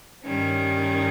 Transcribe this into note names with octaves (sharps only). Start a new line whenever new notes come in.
G2 D#3 G3 C#4